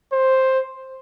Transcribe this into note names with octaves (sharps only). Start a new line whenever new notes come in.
C5